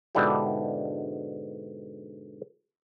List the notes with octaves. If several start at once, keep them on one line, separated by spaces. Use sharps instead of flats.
G#2 B2 D3 D4 E4 G4